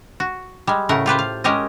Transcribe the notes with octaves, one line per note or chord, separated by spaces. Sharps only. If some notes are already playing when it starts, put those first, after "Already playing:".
F#4
G3 G#3
A2 C#3 A3 A#4 F#5
F4 G4 B4 C5
F5
G#3 C#4 G4 A#4 D#5